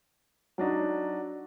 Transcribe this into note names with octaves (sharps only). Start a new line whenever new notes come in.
F#3 D4 D#4 F#4